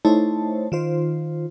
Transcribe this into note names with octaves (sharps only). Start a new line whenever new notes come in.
A3 D#4 E4 C5 C#5 A5
D#3 F4 C5